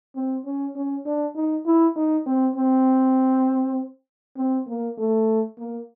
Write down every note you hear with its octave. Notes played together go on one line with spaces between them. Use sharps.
C4
C#4
C#4
D4
D#4
E4
D#4
C4
C4
C4
A#3
A3
A#3